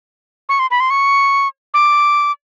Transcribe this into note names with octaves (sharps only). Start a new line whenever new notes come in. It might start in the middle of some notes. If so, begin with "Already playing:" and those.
C#6
C6
B5
C6
C#6
D6